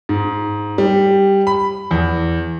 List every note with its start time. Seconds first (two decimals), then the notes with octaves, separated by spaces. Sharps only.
0.09 G#2
0.78 G3
1.47 B5
1.91 E2